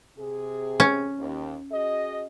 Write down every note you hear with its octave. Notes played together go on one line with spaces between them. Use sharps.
C3 G#4
C#4
D#2
F#4 G#4 D#5